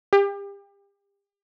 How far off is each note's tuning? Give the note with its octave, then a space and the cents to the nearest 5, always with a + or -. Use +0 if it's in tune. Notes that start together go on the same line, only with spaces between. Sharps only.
G4 +35